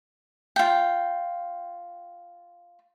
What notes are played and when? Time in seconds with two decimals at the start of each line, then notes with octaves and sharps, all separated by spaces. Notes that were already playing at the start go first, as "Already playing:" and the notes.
0.56 F4 G5